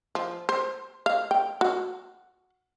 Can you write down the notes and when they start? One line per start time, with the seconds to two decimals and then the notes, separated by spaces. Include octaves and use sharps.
0.15 F3
0.49 C5
1.06 F5
1.31 G5
1.61 F#4